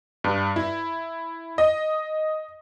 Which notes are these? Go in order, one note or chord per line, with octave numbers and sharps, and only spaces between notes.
G2
E4
D#5